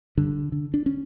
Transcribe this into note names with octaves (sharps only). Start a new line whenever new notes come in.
G2 D3
D3
D4
C#4